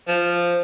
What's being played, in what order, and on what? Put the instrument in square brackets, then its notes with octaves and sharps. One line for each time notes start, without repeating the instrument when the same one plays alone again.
[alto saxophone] F3